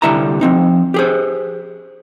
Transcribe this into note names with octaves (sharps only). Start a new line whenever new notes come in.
C2 D3 G3 E4 A5 A#5
F3 C4 D#4
G4 G#4 C5